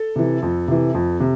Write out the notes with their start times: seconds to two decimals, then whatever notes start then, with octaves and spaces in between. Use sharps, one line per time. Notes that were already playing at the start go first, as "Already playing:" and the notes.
Already playing: A4
0.16 C3 E3
0.42 F2
0.68 C3 E3
0.94 F2
1.20 C3